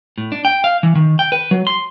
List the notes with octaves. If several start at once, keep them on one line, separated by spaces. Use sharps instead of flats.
A2
D4
G5
F5
E3
D#3
G5
B4
F#3
C6